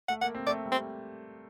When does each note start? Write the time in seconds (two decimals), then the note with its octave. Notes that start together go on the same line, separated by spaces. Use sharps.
0.08 A3 F#5
0.21 A#3 F#5
0.35 C4
0.47 A3 D5
0.66 G3
0.72 C4